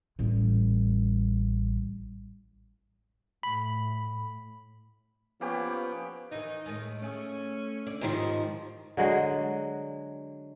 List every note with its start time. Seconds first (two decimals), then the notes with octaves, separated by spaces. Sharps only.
0.19 A1 G3
3.43 A2 B5
5.41 F3 A#3 B3 C#4 G4
6.32 D#3 E3 D#4
6.66 A2 D#3 G#3
7.02 A3 C#4 G#4
7.87 D3 D5
8.01 G#2 D#3 F3 G#3 G4 D#5
8.97 D3 F#3 G#3